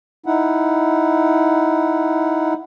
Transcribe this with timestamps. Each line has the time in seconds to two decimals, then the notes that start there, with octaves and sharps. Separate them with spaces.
0.26 D#4 E4 F#5